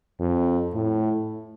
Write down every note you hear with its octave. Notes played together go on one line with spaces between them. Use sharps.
F2
A2